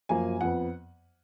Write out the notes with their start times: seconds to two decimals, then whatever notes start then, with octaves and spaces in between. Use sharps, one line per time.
0.09 F#2 F3 A#3 G#5
0.41 F2 F3 B3 F#5